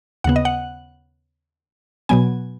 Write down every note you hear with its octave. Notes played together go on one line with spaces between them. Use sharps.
D#2 C#3 B3 F#5
D#5
F#5
B2 F#3 B3 G#5